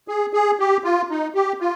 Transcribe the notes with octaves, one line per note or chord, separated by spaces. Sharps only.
G#4
G#4
G4
F4
D#4
G4
F4